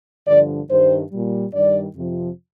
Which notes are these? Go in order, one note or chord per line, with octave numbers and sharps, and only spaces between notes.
G2 D3 F3 D5
G2 D#3 G3 C5
A#2 G3
G2 D#3 G3 D5
F2 C3 F3